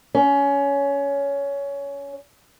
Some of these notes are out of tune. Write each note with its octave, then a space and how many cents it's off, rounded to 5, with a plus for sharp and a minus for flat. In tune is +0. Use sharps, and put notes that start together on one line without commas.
C#4 +20